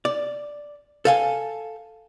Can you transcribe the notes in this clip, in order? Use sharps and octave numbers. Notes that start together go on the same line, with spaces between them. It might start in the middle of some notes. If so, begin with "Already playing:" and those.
D5
A4 F5 G#5